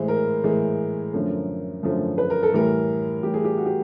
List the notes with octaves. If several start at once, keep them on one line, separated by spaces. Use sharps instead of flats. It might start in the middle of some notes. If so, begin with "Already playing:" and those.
Already playing: A2 E3 G#3 C5
A#4
A2 E3 G#3
F#2 D3 F3 A3
F#2 D3 F3 A3
B4
A#4
A4
A2 E3 G3 A#4
A2 E3 G3 G4
G#4
G4
F#4
G4